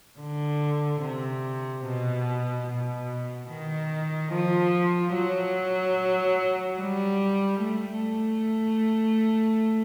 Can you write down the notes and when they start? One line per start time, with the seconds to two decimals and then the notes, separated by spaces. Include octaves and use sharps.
0.20 D3
1.02 C3
1.85 B2
2.67 B2
3.50 D#3
4.32 F3
5.15 F#3
6.80 G3
7.63 A3